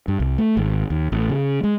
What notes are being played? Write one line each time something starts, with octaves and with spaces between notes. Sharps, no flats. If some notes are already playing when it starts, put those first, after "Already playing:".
G2
C2
A3
G#1
D#2
A1
C#3
G#3